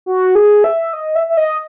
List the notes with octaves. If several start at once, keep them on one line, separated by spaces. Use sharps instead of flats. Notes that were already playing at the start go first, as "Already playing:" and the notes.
F#4
G#4
E5
D#5
E5
E5
D#5